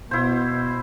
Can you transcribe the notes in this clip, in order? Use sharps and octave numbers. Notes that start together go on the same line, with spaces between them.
B2 E4 C5